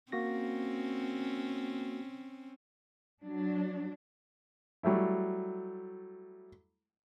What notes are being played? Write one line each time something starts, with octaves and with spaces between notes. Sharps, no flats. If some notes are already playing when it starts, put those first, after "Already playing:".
A#3 C4 C#4 F#4 A#6
F#3 D4
F#3 G3 A3 E4